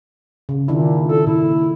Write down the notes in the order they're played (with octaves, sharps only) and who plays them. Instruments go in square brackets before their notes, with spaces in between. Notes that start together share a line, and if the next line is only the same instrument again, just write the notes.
[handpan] C#3
[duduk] A#2 [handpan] D#3 D4 E4
[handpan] E4 [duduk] A4
[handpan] A#2 [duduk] E4